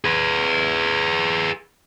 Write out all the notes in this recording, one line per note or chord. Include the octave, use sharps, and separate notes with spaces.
G#4 B4